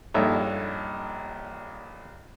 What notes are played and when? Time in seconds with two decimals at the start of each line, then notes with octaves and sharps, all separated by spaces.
0.14 A#1 G2 D#4 A4 C#5 E5